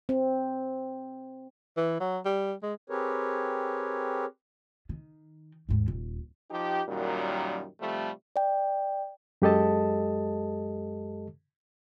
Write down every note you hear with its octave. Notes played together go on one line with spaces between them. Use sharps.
C4
E3
F#3
G3
G#3
C4 G4 G#4 A#4 B4 C#5
D#3
D#2 G#2
D#1
F3 D#4 G4
F#2 A#2 D#3 F#3 G3
C3 F3 G3 A3
D5 G5
F#2 G#3 G4 A4 D#5 A5